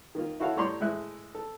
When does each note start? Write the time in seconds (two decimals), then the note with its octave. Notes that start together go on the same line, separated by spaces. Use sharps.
0.15 D#3 A#3 F4
0.40 E4 F#4 A4 C#5 F5
0.57 A2 G3 C#5 D5 A#5 C6
0.80 A2 G#3 E5 F#6
1.35 A4